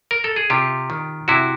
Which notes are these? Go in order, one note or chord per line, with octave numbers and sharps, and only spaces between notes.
A#4
A4
G#4
C3 F4 G4
D#3
C3 E4 F#4